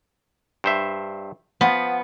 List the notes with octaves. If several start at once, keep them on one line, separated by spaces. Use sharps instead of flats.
G2 C5 E5
F3 B3